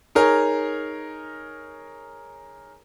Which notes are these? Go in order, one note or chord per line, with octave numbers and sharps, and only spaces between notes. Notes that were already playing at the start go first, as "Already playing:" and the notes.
D#4 G#4 A#4 C#5